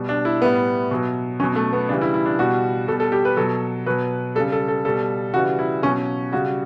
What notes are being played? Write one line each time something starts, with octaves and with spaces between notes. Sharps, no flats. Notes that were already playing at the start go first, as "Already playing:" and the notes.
Already playing: B2 G3
D4
E4
A2 G3 B3
B2 F#3
B2 F#3 C#4
A3
B3
C#3 E3 G3 D4
E4
E4
D4
B2 G3 F#4
B2 G3 A4
A4
G4
B4
B2 F#3 A4
B2 F#3 B4
C#3 G3 A4
A4
A4
B2 G3 A4
C#3 E3 G3 F#4
E4
B2 F#3 C#4
C#3 G3 F#4